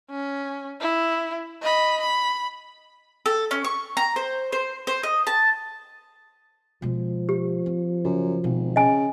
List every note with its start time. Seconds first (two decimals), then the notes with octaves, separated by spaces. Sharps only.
0.10 C#4
0.80 E4
1.62 D#5 B5
2.01 B5
3.26 A4
3.51 C#4
3.64 C#6
3.97 A#5
4.16 C5
4.52 C5
4.87 C5
5.03 D#5
5.27 A5
6.82 B2 F3 G#3
7.29 G4
7.66 C4
8.05 F#2 C#3
8.44 G#1 B2
8.76 C#3 D#5 G#5